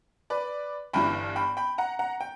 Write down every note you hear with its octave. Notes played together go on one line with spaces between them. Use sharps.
B4 D5
G1 G2 E3 G5 B5
G5 B5
G5 B5
F#5 A#5
F#5 A#5
G5